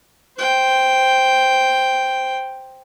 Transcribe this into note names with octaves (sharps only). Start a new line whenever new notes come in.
C5 G5